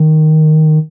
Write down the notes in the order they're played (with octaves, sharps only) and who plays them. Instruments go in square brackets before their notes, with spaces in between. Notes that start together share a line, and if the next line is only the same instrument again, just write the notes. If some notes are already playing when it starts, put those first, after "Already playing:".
Already playing: [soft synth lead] D#3